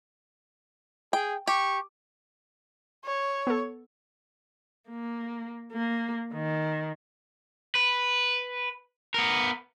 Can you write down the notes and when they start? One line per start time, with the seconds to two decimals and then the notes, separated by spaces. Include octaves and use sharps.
1.13 G#4 G5
1.47 G4 C#6
3.05 C#5
3.47 B3 A4
4.89 A#3
5.72 A#3
6.33 D#3
7.75 B4
9.14 B3 A#4